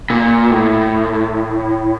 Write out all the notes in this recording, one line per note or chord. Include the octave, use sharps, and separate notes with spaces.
A#2
A2